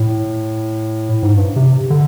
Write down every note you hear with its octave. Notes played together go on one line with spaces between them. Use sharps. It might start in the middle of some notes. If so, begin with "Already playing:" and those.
Already playing: A2
G#2
G2
C3
D3